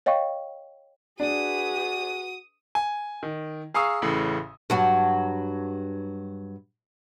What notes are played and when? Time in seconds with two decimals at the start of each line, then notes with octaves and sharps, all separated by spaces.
0.06 C#5 D#5 F5 G5 C#6
1.20 D4 F#4 G#4 B4 D#6
2.75 G#5
3.23 D#3
3.74 G#4 F5 A#5 C#6 D#6 E6
4.02 A1 A2 C#3
4.70 G2 F#3 F#4